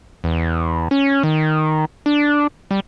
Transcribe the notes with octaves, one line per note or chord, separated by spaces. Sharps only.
E2
C#4
D#3
D4
G3